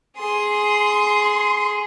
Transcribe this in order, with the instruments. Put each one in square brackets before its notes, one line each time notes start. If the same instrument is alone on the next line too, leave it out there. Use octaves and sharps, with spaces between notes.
[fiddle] G#4 [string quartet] C6